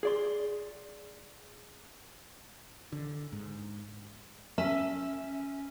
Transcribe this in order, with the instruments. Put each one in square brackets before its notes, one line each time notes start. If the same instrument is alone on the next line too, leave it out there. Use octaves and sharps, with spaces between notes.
[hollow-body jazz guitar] G#4 D5 C6
[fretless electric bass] D3
G#2
[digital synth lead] C#4 [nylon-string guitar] E5